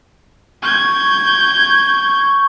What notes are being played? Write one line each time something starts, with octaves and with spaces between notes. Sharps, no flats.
C#6 G6 G#6